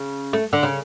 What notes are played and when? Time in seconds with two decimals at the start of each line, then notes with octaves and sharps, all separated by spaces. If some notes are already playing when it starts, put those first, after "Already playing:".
Already playing: C#3
0.33 A3
0.53 D3
0.63 C#3